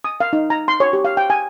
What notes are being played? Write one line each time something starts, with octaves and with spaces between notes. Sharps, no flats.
D#6
F5
D#4
A#5
C6
C#5
G4
F5
G5
G#5